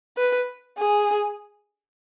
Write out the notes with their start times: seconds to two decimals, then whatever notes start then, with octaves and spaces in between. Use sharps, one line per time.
0.17 B4
0.78 G#4